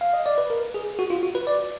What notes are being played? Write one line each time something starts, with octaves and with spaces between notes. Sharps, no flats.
F5
D#5
D5
B4
A#4
G#4
F#4
F4
F#4
B4
D5